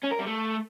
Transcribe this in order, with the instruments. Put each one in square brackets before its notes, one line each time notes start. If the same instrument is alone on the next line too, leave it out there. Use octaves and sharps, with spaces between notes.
[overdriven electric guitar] C#4
A#4
G3
A3